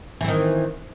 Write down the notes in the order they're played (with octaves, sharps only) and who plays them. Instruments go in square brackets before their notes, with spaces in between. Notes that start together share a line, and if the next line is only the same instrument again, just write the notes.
[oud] E3
C4
D#3